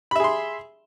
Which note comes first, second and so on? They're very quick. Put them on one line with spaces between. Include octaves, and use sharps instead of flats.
B5 E5 G#4 C6